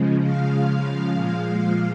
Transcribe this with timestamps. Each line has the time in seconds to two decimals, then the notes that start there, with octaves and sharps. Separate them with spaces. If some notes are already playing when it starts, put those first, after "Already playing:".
Already playing: C#3 F3 G#3
0.22 F5
1.14 A#2 F3 G#3